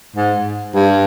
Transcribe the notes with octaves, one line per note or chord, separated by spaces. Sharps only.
G#2
G2